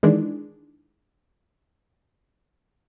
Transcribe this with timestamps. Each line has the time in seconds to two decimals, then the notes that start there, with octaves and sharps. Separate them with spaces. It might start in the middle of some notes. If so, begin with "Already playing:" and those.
0.03 D#3 E3 G#3 D4